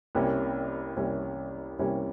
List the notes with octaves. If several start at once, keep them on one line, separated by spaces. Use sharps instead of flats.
C2 C3 G3 A#3 C#4
C2 C3 G3 A#3 C#4
C2 C3 G3 A#3 C#4